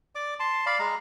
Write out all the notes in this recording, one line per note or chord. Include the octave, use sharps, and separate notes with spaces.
D5 D6
A5 C6
D5 F5 B5
G#3 A#5